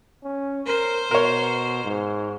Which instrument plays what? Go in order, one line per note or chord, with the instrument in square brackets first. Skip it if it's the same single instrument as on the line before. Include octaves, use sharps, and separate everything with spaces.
[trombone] C#4
[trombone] A#4 [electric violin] C5
[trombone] B2 [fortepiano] A#4 C#5
[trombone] G#2